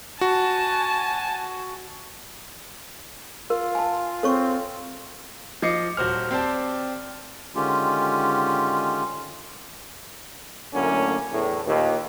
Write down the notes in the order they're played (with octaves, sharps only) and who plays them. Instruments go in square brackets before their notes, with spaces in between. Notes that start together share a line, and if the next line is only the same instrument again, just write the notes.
[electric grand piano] F#4 [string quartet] G#5 A5
[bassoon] F4 [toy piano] A#4
[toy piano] G#5 A5
[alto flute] C4 [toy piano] A4 C#5 C#6
[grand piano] F3 D#5 D6 C7 C#7
D#1 F#4 C5 F6
C4 G4 C5 D5 A5
[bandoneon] D3 D#3 G#3 C#4 F4 G4
[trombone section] F#2 A2 D3 A3 A#3 C#4
E2 A2
D#2 A#2